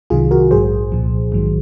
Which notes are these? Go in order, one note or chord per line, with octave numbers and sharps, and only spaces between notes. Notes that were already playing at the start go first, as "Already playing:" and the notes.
C2 C3 D#3 F#3 F4 G#4
F#4 A#4
A#1 G#2 F#3 G#4 C5
C2 A#2 F3
A#1 G#2 D#3 F#3